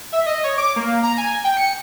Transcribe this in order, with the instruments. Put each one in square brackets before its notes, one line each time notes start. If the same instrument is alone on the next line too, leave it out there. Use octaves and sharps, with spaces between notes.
[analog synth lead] E5
D#5
C#5
D6
A#3
A#5
G#5
G5
C#7